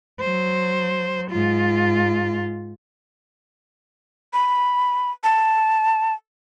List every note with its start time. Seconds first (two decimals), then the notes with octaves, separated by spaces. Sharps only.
0.20 F#3 C5
1.31 G#2 F4
4.33 B5
5.24 A5